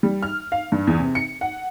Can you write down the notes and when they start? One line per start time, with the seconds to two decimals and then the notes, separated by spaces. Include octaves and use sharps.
0.03 G3
0.23 F6
0.52 F5
0.72 G2
0.87 E2
1.00 C3
1.15 C#7
1.41 F#5